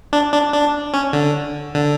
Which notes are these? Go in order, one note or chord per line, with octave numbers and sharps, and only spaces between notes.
D4
D4
D4
C#4
D3
D3